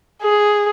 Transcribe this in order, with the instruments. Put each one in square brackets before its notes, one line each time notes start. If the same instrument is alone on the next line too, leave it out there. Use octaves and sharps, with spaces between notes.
[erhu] G#4